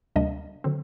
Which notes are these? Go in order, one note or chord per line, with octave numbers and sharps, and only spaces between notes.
D2 C3 G3 A#3 D4 D#5
D3 F#3 C4